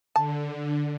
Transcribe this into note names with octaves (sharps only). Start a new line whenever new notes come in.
D3 A5